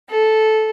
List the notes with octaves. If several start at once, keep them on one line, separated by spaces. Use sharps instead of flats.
A4